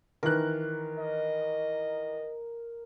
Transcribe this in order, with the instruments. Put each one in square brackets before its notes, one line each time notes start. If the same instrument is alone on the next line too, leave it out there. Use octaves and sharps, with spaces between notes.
[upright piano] D#3 E3 F#6 [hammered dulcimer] A#4
[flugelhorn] D#5